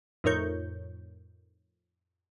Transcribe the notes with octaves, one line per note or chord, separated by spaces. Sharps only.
F2 A2 D#4 A#4 C#5 G6